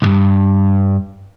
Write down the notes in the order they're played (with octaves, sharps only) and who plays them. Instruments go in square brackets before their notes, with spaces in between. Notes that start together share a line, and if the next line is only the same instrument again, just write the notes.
[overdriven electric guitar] C2 G2